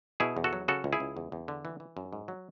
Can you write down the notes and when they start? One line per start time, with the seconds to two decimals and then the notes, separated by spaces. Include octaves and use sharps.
0.20 B2 E4 G#4
0.37 E2
0.44 F#4 A4
0.53 F#3
0.68 C#3 F#4 A4
0.84 C#2
0.93 E4 G#4
1.00 C#2
1.17 E2
1.32 E2
1.48 D3
1.65 E3
1.80 E3
1.97 F#2
2.13 G#2
2.28 F#3